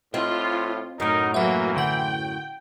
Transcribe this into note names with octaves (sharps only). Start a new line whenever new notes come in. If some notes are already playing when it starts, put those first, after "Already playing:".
A2 C4 F4 D#5
F#2 A2 D#4 A#4
E3 F#3 A#3 E5 F#5
D3 F#5 G5 F#7